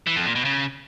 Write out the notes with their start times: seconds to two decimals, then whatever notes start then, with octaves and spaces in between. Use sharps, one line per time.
0.07 E3
0.16 F2
0.26 A#2
0.35 B2
0.45 C#3